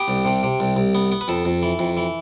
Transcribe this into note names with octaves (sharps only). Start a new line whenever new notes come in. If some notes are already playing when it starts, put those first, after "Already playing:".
Already playing: B3 G4
C2
C3
C3
C2
C2
B3
B3
B4
F2 A4
F2
E3
F2
E3